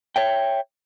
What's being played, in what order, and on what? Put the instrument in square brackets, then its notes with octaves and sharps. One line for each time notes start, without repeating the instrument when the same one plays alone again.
[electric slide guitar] C#5 E5 G5